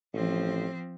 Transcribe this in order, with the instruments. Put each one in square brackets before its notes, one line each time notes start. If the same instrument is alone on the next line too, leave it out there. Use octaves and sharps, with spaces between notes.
[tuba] A1 [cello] F3 C4